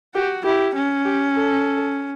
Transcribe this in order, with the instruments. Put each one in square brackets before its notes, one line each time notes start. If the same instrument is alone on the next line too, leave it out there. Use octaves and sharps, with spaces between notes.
[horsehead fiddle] F#4 [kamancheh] G4
[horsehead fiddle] E4 [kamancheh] G4
[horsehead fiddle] C#4
[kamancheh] G4
A4